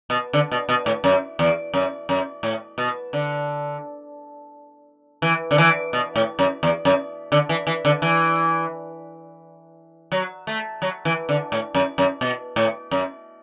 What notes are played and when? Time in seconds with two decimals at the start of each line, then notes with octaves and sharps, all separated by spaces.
0.10 B2
0.33 D3
0.51 B2
0.69 B2
0.86 A2
1.04 F#2
1.39 E2
1.74 F#2
2.09 F#2
2.43 A2
2.78 B2
3.13 D3
5.22 E3
5.51 D3
5.58 E3
5.93 B2
6.16 A2
6.39 F#2
6.63 E2
6.85 F#2
7.32 D3
7.49 E3
7.67 E3
7.85 D3
8.02 E3
10.12 F#3
10.47 A3
10.82 F#3
11.05 E3
11.29 D3
11.52 A2
11.75 F#2
11.98 F#2
12.21 B2
12.56 A2
12.91 F#2